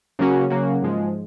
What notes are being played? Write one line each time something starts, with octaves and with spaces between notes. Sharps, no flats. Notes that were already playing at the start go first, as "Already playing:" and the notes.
C#3 F#3 A#3 C#4 F#4
C#3 F#3 A#3 C#4 F#4
G#2 F3 G#3